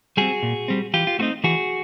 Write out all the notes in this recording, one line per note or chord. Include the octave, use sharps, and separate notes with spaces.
G3 C4 F#4 G#4
A#2
G3 C4
E3 F4 G4
F4
A3 C4 D#4 F#4
E3 F#4 G#4